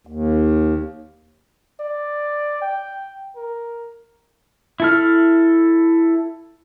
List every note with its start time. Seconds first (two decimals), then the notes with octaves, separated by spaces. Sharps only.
0.07 D#2
1.80 D5
2.62 G5
3.36 A#4
4.80 E4 A4 F6